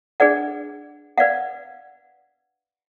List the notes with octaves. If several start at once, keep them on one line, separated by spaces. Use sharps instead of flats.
D4 G#4 B4 D5 F#5
B4 D5 F5 F#5